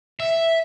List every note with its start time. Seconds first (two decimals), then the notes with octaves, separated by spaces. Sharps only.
0.20 E5